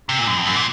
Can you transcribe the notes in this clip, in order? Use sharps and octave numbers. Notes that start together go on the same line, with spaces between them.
C3
A#2
F#2
F2
F#2
A#2